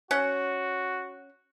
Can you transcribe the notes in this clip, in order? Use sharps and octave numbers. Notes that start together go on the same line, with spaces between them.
C#4 F#4 F#5